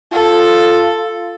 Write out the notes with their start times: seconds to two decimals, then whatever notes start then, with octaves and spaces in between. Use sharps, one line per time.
0.12 F4 A4